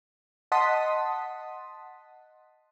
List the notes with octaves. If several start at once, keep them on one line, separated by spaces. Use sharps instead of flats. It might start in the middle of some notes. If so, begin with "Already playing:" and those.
D#5 F#5 A5 C6 D#6 B6